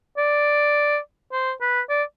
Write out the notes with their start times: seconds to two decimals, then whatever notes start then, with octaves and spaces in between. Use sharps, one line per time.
0.17 D5
1.32 C5
1.61 B4
1.89 D5